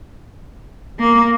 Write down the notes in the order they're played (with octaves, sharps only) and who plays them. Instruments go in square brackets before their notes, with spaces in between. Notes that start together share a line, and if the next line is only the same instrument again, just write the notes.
[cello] A#3